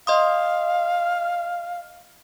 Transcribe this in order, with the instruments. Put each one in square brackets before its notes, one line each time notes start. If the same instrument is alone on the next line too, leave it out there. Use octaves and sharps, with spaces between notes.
[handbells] D#5 C6 D#6 [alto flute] F5